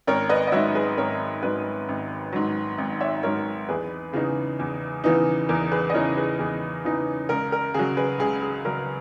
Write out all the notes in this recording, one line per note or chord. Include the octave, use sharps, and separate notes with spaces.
G#1 A#4 C#5
B4 D#5
D#5
G#2 F#3 C#5 E5
G#4 B4
G#1 A#4 C#5
G#2 F#3 B4 D#5
G#1
G#2 F#3
G#1
C#5 E5
G#2 F#3 A#4 C#5
E2 G#4 B4
C#3 E3 B3 D#4 G#4
E2
C#3 E3 B3 D#4
E2 A#4
G#4 B4
D#5
C#3 E3 B3 D#4 A#4 C#5
G#4 B4
E2 G#4
C#3 E3 B3 D#4
C#2 A#4
A#4
C#3 F#3 G#4
G#4 B4
C#2 G#4
G#4
C#3 F#3 A#4